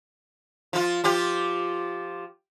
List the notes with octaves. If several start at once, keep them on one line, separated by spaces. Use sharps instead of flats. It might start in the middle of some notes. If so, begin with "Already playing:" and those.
F3 F4
F3 F4 G4